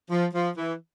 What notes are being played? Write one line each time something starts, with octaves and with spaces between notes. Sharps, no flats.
F3
F3
E3